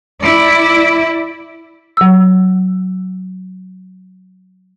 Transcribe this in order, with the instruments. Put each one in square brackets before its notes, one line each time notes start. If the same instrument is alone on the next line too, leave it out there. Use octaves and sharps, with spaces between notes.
[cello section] E4 D5
[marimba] F#3 E6